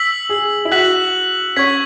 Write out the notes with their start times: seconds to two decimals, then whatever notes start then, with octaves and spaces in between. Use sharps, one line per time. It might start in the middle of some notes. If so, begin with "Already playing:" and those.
Already playing: E6 B6 F#7
0.29 G#4
0.65 E4
0.72 F#4 F#6 B6 F#7
1.56 C#4 C#6 G#6 B6